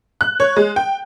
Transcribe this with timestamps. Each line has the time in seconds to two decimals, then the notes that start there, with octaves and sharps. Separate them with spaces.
0.21 F#6
0.40 C#5
0.57 G#3
0.76 G5